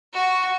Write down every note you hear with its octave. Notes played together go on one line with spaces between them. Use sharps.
F#4